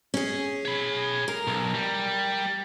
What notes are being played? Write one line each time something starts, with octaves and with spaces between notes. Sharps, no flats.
C#4 G#4
C#5 B5
A#4
B1
G3